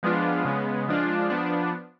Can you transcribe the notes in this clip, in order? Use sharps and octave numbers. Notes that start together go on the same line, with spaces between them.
F3 G#3 B3 D4 F4
C#3 G#3 B3
F3 G#3 D4 F4
F3 B3 D4